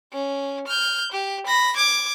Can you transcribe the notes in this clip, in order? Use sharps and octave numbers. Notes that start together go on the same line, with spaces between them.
C#4
F6 G6
G4
B5 A#6
D6 G#6